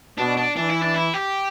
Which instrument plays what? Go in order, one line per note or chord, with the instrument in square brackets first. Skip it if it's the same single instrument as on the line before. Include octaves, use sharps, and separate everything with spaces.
[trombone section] B2 [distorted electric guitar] D4
[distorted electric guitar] D4
[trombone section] E3 [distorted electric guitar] D4
[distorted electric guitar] E4
D4
E4
G4